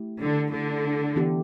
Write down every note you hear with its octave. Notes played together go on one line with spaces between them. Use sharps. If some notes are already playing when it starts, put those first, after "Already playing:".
Already playing: A3 E4 G4
D3
D3 A3 E4 A4
E3 B3 E4 G4